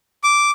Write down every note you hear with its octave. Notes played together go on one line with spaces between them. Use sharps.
D6